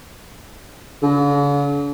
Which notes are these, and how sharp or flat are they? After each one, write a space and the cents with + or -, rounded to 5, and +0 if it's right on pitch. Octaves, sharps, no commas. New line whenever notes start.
D3 -45